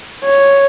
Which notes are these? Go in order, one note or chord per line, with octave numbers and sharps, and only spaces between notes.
C#5